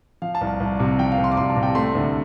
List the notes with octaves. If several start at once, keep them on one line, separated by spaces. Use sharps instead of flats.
F3 F5
A5
C2
A5
C2
C3
F3 G5
F5
C2
C6
D6
C2 C6
A5
C3
G5
A3 C6
D2